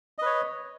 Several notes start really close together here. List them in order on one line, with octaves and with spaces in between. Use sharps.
D#5 B4 C#5